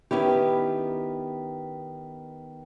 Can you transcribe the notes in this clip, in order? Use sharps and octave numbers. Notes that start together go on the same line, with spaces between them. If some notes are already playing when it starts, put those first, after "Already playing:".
D#3 B3 C#4 E4 G4